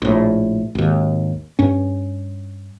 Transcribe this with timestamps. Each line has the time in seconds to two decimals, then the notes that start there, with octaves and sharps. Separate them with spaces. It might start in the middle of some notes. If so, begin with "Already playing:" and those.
0.02 A#1 A2
0.75 G#1 D#2
1.59 G2 C#4